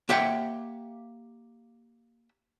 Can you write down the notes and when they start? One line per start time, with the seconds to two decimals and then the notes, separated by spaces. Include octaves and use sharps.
0.09 A#3 G4 E5 F#5 G5